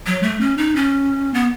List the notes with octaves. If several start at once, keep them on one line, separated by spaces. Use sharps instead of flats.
F#3
A3
C#4
D#4
C#4
B3